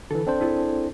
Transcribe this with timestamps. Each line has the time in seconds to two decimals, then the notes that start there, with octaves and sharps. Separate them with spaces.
0.11 D3 E3 A4
0.27 C4 D4 C5
0.41 E4 G#4 A4